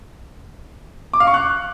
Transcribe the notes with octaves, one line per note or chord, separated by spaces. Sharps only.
D6
F5
C#6
F#6